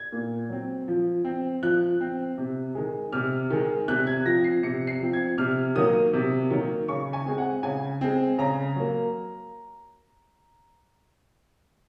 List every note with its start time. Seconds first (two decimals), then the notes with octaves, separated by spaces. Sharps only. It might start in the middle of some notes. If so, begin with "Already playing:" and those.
Already playing: G#6
0.12 A#2
0.49 F#3 C4
0.88 F3
1.25 C4
1.63 F3 F#6
2.01 C4
2.38 C3
2.75 D#3 G#3
3.12 C3 F6
3.50 D#3 G#3
3.88 C3 F#6
4.07 G#6
4.25 F3 C4 A#6
4.44 C7
4.63 C3 C#7
4.87 C7
5.01 F3 C4
5.13 G#6
5.38 C3 F6
5.75 D#3 F#3 A#3 D#6
6.13 C3
6.50 D#3 F#3 A#3
6.88 C#3 C#6
7.13 G#5
7.26 G#3 C4
7.38 F#5
7.63 C#3 G#5
8.01 G#3 C4
8.38 C#3 A#5
8.76 F#3 A#3